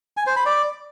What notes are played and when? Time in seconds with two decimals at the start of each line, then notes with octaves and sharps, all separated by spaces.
0.17 G#5
0.27 C5
0.36 B5
0.46 D5